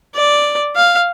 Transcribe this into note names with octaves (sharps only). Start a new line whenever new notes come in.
D5
F5